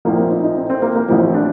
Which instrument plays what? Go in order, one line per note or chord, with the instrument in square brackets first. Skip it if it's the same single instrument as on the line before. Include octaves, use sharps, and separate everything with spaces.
[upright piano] A#1 A2 F3 A#3
C4
D#4
D#4
C4
C4
A#3
A#3
A1 A2 F3 C4
D4